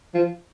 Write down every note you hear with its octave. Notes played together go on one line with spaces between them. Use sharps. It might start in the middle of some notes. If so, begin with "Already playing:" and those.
F3